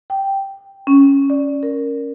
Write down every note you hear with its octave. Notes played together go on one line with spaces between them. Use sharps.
G5
C#4
D5
A#4